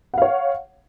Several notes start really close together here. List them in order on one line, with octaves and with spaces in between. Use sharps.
F#5 F5 C#5